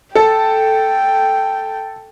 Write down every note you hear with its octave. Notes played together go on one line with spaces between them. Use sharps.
A4 G5